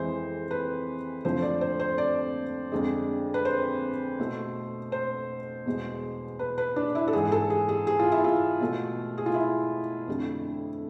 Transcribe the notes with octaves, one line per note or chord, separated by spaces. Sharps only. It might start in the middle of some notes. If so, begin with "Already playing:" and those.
Already playing: F2 E3 G#3 C5
B4
F2 D3 F3 A3 C5
D5
C5
C5
D5
F2 D3 G#3
B4
C5
B2 A3
C5
E2 B2 G#3
B4
B4
D4
E4
A4
G#2 E3 G#3 G#4
A4
G#4
G#4
G#4
F4
E4
F4
B2 A3
G#4
F4
E4
F2 D3 A3